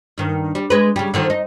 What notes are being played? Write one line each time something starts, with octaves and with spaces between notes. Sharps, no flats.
G2 D#3
G3
G#3 B4
C#3 G3
D3 D#3 F3
D#4